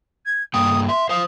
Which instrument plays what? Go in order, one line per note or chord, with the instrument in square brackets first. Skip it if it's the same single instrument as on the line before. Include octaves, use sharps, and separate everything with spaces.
[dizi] G#6
[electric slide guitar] G2 A#3 G5 [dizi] D#6
[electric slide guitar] E5 [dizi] C6
[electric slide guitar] C5 F5 [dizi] D#6